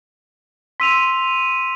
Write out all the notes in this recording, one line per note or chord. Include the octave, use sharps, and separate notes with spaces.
C6 E6 B6 D#7 F7